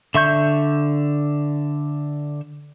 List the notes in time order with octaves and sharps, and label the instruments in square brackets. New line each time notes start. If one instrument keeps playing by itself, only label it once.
[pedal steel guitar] D3 E5 C#6 G6